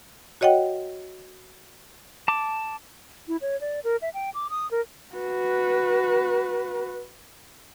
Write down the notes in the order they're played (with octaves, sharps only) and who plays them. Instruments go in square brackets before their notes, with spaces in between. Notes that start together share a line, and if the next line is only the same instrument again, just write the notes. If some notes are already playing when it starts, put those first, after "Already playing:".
[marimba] F#4 C#5 D#5 F#5 G5
[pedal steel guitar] A5 D6
[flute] E4
C#5
D5
A#4
E5
G5
D6
D#6
A#4
[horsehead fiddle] F#4 B4